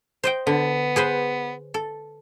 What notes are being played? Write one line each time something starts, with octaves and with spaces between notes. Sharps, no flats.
C5 D#5 G5
D3 B3
G#4 B4 C5
A4